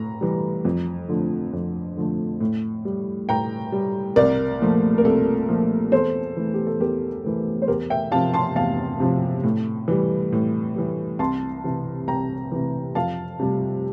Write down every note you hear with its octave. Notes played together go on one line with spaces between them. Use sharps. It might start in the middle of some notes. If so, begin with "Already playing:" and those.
Already playing: A2 A#5
E3 G3
F2
D3 F3 A3
F2
D3 F3 A3
A2
G3
A2 G5 A#5
G3
C2 A#4 D5
A#2 F3 A3
A#4
C2 A4
A#2 F3 A3
E2 A4 C5
E3 A3
G4
A4
E2 G4 A#4
E3 A3
C5
E2 G4 A#4
E5 G5
C3 F3 F5 A5
A5 C6
E2 F5 A5
C3 F3
A2
E3 G3
A2
E3 G3
C2 A5 C6
C3 E3
C2 G5 A#5
C3 E3
F2 F5 A5
C3 G3